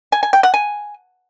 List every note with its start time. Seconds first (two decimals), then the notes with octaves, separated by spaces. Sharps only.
0.12 G#5
0.23 G#5
0.33 G5
0.43 F#5
0.54 G#5